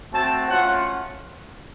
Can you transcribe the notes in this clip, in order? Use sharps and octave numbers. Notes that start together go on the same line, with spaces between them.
A3 C4 F#4 A5
A3 C#4 F4 F#5